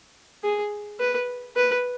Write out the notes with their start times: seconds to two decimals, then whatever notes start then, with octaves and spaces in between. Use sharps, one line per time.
0.44 G#4
1.00 B4
1.56 B4